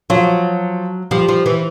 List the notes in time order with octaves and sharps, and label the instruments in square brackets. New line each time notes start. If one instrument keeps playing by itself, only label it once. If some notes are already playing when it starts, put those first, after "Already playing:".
[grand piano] F3 F4 [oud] F#3
[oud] F3 [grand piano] G3 G4
[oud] F3
E3